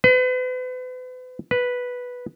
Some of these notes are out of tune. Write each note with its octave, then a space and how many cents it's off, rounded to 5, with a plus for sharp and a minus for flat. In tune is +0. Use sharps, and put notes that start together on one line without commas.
B4 +40
B4 -5